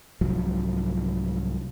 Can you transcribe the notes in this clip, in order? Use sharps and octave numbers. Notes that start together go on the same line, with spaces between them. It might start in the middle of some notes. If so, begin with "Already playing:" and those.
C2 G#2 F3 F#3